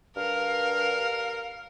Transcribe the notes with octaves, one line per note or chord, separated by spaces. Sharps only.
G2 A#4 F5 F6